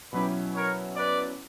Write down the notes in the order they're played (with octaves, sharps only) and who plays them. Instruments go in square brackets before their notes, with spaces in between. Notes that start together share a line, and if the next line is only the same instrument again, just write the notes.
[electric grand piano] B2 F#3 C#4 E4 [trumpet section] G4 B4
[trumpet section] A#4 C#5
B4 D5